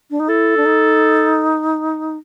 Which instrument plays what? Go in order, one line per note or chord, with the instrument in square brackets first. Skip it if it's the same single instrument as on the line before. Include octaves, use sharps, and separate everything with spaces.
[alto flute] D4
D#4
[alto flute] E4 [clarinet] A4
[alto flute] D4
D#4